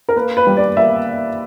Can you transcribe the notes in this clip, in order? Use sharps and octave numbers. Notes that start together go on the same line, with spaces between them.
A#4
A#3 B4
B4
G3
D5
A#3 E5